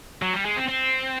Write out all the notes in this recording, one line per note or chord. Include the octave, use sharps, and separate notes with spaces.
F#3
G3
G#3
C4
C4